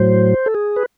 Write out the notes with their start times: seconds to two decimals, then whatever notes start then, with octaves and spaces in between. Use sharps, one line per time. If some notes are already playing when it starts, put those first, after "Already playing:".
Already playing: A2 F#3 C5
0.46 A4
0.55 G#4
0.76 B4